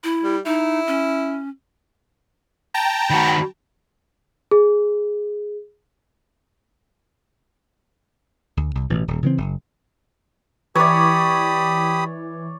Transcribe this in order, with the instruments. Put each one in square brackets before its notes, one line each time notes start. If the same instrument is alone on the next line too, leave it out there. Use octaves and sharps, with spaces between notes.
[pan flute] E4
[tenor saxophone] G3
[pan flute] D#4 [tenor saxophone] E4
[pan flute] C#4
[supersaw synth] G5 A5 A#5
[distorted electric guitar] D#3 F#4 [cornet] B5
[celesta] G#4
[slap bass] D2
C2
A1 B2 E3
D#1
C#3 E3 C4
F#1
[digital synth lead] E3 [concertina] G4 B5 D#6 [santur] C#5 D5